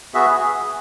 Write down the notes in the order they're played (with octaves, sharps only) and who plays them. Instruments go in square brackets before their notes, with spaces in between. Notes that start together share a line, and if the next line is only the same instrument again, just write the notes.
[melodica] B3 F#4 G#4 E5
G#4